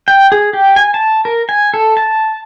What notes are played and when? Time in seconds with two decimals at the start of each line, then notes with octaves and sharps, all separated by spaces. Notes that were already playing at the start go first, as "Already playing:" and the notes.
0.08 G5
0.32 G#4
0.53 G4
0.76 G#5
0.94 A5
1.25 A#4
1.49 G#5
1.74 A4
1.97 A5